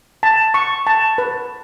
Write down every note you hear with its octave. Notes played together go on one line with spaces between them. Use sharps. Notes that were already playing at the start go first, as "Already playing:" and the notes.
A5
C#6
A5
B4